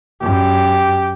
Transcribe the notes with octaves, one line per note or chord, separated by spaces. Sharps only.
F#2 G4